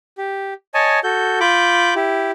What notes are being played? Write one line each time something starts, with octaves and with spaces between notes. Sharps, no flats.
G4
C#5 D#5 G#5 A5
F#4 A4 G6
F4 B5 D6 G6
E4 G4